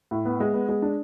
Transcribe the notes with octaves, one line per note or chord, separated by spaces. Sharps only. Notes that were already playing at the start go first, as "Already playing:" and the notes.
A2
B3
G#3
B3
G#3
D4